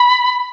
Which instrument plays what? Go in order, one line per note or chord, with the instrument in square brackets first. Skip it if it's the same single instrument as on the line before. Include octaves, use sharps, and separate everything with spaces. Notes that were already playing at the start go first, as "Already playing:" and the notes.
Already playing: [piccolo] B5